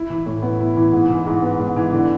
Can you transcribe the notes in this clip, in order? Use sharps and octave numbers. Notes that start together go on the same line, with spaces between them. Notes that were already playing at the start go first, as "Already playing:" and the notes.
Already playing: E4
E3
A2
B3
E4
E3
G#2
E3
G#2
B3
G#2
E3
D3